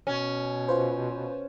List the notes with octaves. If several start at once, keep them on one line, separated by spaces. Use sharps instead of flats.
B2 C#4
F4 B4 C5